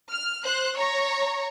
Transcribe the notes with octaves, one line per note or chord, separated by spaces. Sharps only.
F6
C5 F#6
C#5 A#5 C#6